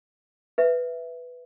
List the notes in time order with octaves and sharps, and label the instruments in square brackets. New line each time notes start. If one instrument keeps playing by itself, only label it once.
[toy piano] B4 E5